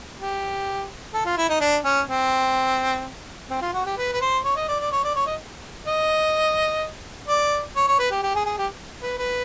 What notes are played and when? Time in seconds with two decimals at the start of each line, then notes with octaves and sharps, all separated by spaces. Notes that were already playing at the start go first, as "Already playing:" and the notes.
0.19 G4
1.14 A4
1.25 F4
1.37 E4
1.49 D#4
1.60 D4
1.84 C#4
2.07 C4
3.50 C4
3.62 F4
3.73 F#4
3.86 G4
3.97 B4
4.13 B4
4.21 C5
4.44 C#5
4.56 D#5
4.68 D5
4.80 D5
4.92 C#5
5.04 D5
5.15 C#5
5.27 D#5
5.87 D#5
7.28 D5
7.76 C#5
7.87 C#5
7.99 B4
8.11 G4
8.23 G4
8.35 G#4
8.46 G#4
8.58 G4
9.02 B4
9.18 B4